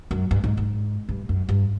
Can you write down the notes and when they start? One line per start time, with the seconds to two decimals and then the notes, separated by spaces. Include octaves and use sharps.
0.11 F#2
0.31 G2
0.44 G#2
0.57 G#2
1.09 G2
1.29 F#2
1.49 G2